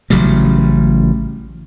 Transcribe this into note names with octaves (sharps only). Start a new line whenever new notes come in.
A1 C#3 F#3 G3